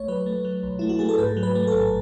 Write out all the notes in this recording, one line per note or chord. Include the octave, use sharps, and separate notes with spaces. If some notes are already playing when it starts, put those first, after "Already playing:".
Already playing: B1 A3 C#5
F#3 B4
A3
F#3
B1
A3 E4
F#4
A3 G#4
A4
G#2 B4
F#3
B4
A3
A4
A1